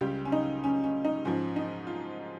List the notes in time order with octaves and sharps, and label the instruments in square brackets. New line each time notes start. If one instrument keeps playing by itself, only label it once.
[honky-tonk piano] C#2 C#3 G3 G4
C#4
D#4
C#4
C#4
D#4
G#2 F3 C#4
D#4
F4